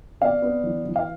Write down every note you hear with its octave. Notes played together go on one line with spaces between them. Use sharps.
B3 D5 F5
B3
E3
E3
F5